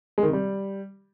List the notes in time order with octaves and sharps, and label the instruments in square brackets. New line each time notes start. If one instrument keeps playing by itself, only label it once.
[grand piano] G#3
D#3
C3
G3